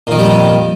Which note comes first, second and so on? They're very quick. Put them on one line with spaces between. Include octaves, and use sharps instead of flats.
A#2 D#3 F2 G3